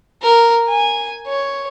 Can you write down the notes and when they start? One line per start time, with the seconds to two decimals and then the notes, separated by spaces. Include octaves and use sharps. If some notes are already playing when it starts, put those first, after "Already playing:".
0.22 A#4
0.68 G#5
1.27 C#5